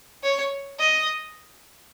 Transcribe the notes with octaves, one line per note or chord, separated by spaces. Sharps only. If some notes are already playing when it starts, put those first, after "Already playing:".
C#5
D#5